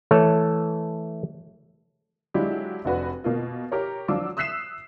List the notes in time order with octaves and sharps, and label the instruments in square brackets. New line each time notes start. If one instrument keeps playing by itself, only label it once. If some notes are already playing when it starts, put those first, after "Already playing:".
[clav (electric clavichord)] E3 A3 A4 C#5
[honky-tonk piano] F#3 G#3 D4 E4 F4 G4
F1 D4 F#4 B4
B2 A#3 F4
G4 A#4 C#5
F3 F#3 D4 F4 D6 E6
D#6 E6 F#6 B6 C7 E7